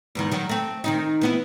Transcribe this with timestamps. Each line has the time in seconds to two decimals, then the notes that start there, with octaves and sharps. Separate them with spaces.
0.15 E2 G#2 D#3
0.32 D#3 F#3
0.49 A3 C4
0.84 D#3 C4 D#4
1.21 E3 B3 E4